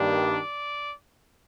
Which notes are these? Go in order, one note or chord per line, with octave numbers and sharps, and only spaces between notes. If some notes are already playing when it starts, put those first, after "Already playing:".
Already playing: G2 D#3 G3 A#3 D4
D5